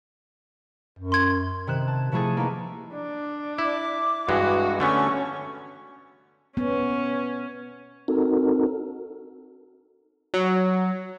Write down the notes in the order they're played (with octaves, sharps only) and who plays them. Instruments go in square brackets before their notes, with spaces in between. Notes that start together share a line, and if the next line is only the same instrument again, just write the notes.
[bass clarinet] F#2
[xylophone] C6 G#6
[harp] C3 D#3 F#6 E7
A5
C3 F3 A3 E4 G#4 A4
A#3 B3 D#4 G#4
[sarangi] D4
[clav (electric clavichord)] E4 [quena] D6
[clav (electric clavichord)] G2 E3 G#3 [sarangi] F#4
[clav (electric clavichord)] D3 A3 B3 [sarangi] C#4 [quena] C#6
[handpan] B3 [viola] C#4
[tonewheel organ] C4 D#4 F#4 A4 A#4
[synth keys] F#3